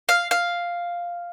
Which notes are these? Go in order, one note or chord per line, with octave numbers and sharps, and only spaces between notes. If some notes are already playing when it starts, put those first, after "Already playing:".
F5
F5